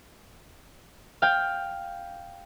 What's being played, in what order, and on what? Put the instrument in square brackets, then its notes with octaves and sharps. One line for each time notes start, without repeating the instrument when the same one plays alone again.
[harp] F5 G5